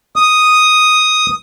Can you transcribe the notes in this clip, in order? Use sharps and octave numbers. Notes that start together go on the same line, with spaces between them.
D#6